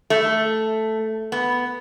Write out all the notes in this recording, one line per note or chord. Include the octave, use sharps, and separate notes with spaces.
A3
B3